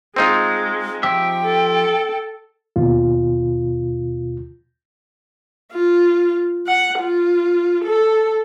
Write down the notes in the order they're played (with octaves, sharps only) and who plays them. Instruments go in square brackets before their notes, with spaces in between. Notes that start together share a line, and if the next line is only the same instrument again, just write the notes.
[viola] G#3 [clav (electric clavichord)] C4 D#4 F4
[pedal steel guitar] F3 G4 E5 [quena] G5
[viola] A4
[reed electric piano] D#2 B2 F4
[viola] F4
F#5
F4
A4